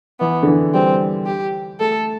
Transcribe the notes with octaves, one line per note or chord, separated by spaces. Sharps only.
E3 B3
D3
E3
G3 C4
G4
A3 A4